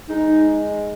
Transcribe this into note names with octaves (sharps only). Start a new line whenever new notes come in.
G#3 D#4